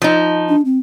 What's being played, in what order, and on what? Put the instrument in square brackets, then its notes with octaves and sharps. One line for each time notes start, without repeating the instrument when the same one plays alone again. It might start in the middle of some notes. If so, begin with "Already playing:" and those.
[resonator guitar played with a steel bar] F3 D#4
[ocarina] D4
C4